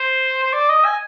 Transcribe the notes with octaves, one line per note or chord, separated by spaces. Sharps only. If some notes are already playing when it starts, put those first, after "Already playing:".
Already playing: C5
C5
D5
D#5
G#5